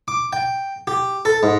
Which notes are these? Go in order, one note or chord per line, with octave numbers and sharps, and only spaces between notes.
D6
G5
G4
A4
G#2